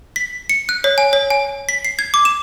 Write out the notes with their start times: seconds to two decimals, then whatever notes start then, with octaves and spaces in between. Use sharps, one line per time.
0.16 B6
0.49 C#7
0.69 F#6
0.84 C#5
0.98 G#5
1.13 C#5
1.30 G#5
1.69 B6
1.85 C7
1.99 G#6
2.14 D6
2.25 E7